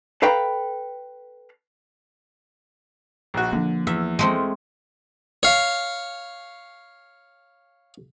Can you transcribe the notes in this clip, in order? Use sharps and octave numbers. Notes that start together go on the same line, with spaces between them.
A4 B4 F5 G5 A#5 B5
A#1 F#4
D3 F3 A#3
E2 E5
G#3 A3 C4
C#5 F5